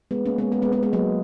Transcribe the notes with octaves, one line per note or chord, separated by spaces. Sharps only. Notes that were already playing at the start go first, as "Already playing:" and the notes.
G#3 B3
A#3 C#4
G#3 B3
G#3 B3
G#3 B3
G#3 B3
G#3 B3
F#3 A#3